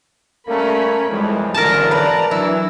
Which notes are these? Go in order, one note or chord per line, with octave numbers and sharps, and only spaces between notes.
G3 A3 A#3 C#4 A#4 B5
B1 F2 E3 G3 G#3
G#1 F#2 D3 E3 A#4 A5 A#6
B4 D5 A5 A#5
E3 F#3 D4 E4